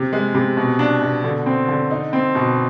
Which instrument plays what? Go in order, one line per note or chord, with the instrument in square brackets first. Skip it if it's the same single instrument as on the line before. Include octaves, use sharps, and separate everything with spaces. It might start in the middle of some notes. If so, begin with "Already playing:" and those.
Already playing: [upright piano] C3
G#3
C3
B2
D4
B2
D3
C4
D3
D#4
C4
B2